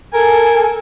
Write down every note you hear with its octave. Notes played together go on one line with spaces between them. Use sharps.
A4 A#4 G#5